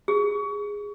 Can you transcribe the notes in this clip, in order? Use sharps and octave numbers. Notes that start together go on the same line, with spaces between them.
G#4